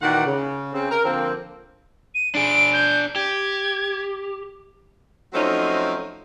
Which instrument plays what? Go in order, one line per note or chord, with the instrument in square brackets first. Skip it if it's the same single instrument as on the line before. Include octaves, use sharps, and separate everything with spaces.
[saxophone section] A#2 D#3 E3 F#4 D5 F#5
C#3
C#3 C4
A#4
D3 F3 A#3 C4
[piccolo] D#7
[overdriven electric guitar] D4 G#4 [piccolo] D7
[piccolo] G6
[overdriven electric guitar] G4 [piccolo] G#6
[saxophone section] F3 F#3 A3 C4 C#4 D#4